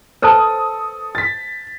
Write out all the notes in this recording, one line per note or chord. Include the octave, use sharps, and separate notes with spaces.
A4 B4 C5 A5 D#6
A6 B6